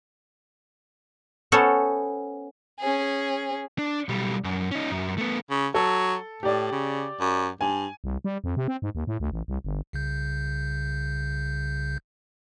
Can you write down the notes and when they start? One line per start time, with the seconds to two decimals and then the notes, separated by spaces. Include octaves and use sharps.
1.52 B3 C#4 A4 C5 C#5
2.80 C#4 G#4
3.79 D4
4.09 B1 G3
4.44 F#2
4.72 C#4 D#4
4.91 F#2
5.18 A3 B3
5.50 C#3
5.74 F#3 A4
6.43 A2 G4 D5
6.72 C#3
7.20 F#2
7.61 G2 G#5
8.04 C2
8.24 G3
8.44 F2
8.57 C3
8.68 C4
8.82 G#2
8.95 D#2
9.07 A2
9.20 D2
9.32 A1
9.48 C2
9.65 G1
9.93 C2 C#3 G6